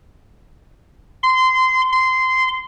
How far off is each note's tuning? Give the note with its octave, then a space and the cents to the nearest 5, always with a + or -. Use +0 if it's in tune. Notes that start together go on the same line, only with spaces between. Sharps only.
C6 -20
C6 -15